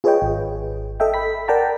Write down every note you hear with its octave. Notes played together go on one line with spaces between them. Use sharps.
F4 G#4 B4 C#5 D#5 G5
G#1
A4 D#5 E5 G5
B5 B6
A#4 D5 F#5 G5 A5 A#5